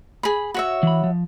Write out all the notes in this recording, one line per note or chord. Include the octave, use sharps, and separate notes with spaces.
G#4 B5
F#4 C#5 E5
E3 B5
F3